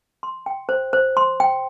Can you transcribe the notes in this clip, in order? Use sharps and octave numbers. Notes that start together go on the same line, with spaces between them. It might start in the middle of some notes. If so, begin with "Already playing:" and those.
C6
G5
C5
C5
C6
G5